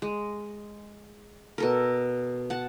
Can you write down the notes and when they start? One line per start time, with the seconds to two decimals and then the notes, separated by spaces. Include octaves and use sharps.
0.02 G#3
1.58 B2 A4 A#4
2.50 F#5 A5